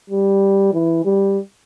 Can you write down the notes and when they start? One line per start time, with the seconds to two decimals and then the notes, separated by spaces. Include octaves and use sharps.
0.10 G3
0.73 E3
1.05 G3